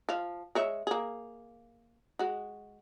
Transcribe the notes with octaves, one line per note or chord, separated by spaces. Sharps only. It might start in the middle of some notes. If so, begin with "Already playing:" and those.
F3 F5
G#3 C#5 E5
A#3 G#4
G#3 F#4